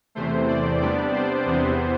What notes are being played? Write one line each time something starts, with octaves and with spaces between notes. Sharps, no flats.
E2 C3 E3 A3 C5
D5
C3 G3 B3 D4 D5
C5
E2 C3 E3 B3